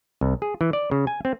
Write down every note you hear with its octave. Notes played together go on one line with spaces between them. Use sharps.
C2
G#4
E3
D5
C#3
G#5
C4